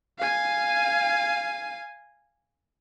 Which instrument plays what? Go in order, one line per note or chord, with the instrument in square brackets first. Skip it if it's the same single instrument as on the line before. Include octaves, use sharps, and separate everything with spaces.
[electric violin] F5 G#5